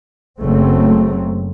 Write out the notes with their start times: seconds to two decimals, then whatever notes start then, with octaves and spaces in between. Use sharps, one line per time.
0.40 F#1 C#3 F#3 A3 C4